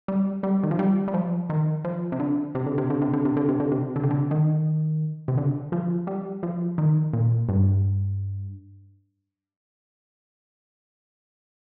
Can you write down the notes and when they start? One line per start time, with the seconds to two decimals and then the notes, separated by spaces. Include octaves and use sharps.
0.08 G3
0.43 G3
0.63 D#3
0.71 F3
0.79 G3
1.08 G3
1.14 F3
1.50 D#3
1.85 F3
2.12 C3
2.20 D3
2.55 C3
2.66 D3
2.78 C3
2.90 D3
3.02 C3
3.13 D3
3.25 C3
3.37 D3
3.49 C3
3.60 D3
3.72 C3
3.96 D3
4.03 C3
4.11 D3
4.31 D#3
5.28 C3
5.38 D3
5.72 F3
6.07 G3
6.43 F3
6.78 D#3
7.13 A#2
7.49 G2